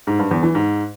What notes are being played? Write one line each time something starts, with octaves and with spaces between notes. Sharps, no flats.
G#2
G2
E2
E3
G#2